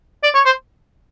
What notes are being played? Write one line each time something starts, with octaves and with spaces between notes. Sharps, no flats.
D5
C#5
C5